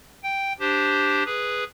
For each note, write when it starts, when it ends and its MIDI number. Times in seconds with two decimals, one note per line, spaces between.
0.24 0.53 79
0.60 1.24 62
0.60 1.24 67
0.60 1.24 72
1.25 1.64 68
1.25 1.64 71